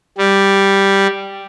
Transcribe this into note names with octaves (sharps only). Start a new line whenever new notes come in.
G3